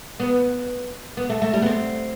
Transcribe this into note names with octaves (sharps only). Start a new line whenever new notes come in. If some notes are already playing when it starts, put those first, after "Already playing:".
B3
B3
A3
A3
G3
B3
C4